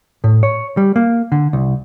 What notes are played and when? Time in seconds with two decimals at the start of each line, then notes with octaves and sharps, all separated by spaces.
0.24 A2
0.43 C#5
0.77 G3
0.96 A#3
1.32 D3
1.53 C2